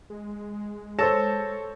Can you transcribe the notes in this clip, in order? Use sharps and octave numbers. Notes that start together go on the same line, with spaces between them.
G#3
A4 C5 C#5 E6 A6 A#6 E7